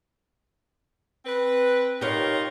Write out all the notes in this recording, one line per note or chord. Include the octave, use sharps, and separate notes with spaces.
C4 B4
D#4 F4 G4 A#4 C#5